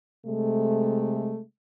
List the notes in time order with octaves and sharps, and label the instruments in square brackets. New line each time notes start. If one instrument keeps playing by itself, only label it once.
[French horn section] C3 G#3 A3